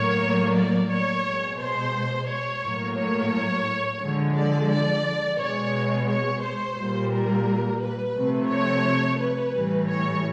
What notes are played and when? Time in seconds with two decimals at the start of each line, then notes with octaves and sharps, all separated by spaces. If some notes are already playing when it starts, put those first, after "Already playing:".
Already playing: A2 F#3 A#3 C#5
0.55 D5
0.90 C#5
1.24 B2 G#3
1.60 C5
2.27 C#5
2.63 A2 F#3 A#3
2.97 C#5
4.00 D3 F3 G#3
4.35 D5
4.70 D5
5.38 B2 G#3 C#5
6.08 C#5
6.42 C5
6.77 A#2 G3 A#3
7.12 A#4
7.81 B4
8.15 C3 F3 A3
8.50 C#5
9.19 B4
9.54 A2 E3 G3
9.88 C#5